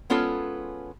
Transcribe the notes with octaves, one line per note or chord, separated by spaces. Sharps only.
G#3 B3 C#4 F4 A4